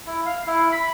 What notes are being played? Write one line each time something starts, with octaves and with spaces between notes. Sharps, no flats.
E4
F5
E4
B5